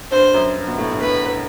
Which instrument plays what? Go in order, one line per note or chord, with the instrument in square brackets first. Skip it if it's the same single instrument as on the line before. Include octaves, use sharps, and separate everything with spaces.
[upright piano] G2 [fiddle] C5
[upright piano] F#2
G2
B2
A2
G2
[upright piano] A2 [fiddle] B4